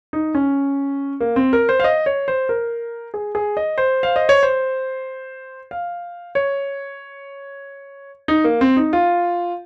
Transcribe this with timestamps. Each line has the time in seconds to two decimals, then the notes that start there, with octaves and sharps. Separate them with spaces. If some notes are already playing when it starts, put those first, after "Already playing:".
0.13 D#4
0.35 C#4
1.21 A#3
1.36 C4
1.53 A#4
1.69 C5
1.80 F5
1.84 D#5
2.06 C#5
2.28 C5
2.49 A#4
3.14 G#4
3.35 G#4
3.57 D#5
3.78 C5
4.03 F5
4.16 D#5
4.29 C#5
4.43 C5
5.71 F5
6.35 C#5
8.28 D#4
8.44 A#3
8.61 C4
8.77 D#4
8.93 F4